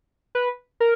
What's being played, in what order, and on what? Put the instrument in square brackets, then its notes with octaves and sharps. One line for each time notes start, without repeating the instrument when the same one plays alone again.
[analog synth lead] B4
A#4